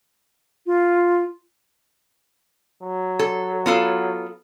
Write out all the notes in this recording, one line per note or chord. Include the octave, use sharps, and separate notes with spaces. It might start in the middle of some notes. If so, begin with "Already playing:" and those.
F4
F#3
A4
B3 F4 A4